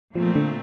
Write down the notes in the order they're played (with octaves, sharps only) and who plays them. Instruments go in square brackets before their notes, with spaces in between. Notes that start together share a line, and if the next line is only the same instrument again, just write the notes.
[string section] A#2 A3 C4 [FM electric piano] F3
[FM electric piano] D3